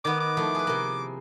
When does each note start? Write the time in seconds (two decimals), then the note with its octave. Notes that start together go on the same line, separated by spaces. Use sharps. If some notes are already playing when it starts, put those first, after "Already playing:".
0.05 D#3 B3 D6
0.20 D6
0.37 F3 A3 E4
0.55 G#4 B4
0.67 C3 A#3